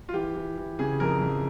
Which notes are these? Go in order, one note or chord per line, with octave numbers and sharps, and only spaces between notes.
F4
E3 G4
E3
E3
C#3 G#4
F2 A#4
F2